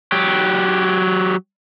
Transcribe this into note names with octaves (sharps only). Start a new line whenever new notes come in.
F#3 G4